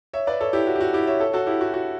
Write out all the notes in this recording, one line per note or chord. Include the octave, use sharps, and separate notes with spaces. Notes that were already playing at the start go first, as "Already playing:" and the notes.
C#5 E5
B4 D5
A4 C#5
E4 G4
F#4
G4
F#4
E4 G4
C#5 E5
A4 C#5
F#4 A4
E4 G4
F#4
F#4